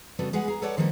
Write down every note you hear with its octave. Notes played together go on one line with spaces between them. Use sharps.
C#3 G3 B3 F#4 A4
G#3 G#4 B4 F#5
G#4 A#5
A4 B4 C#5 D5 F#5 A5
A#2 D#3 F3 G3 A#3 B3